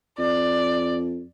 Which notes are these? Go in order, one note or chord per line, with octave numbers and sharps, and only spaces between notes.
F2 D5